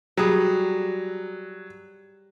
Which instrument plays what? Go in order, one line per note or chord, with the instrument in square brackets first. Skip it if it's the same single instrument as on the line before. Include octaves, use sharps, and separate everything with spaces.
[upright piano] F#3 [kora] G3 G#4